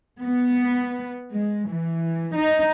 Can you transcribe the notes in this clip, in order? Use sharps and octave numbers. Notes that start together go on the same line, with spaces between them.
B3
G#3
E3
D#4